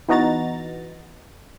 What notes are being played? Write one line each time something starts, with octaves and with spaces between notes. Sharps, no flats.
E3 B3 D#4 F#4 A#5 A6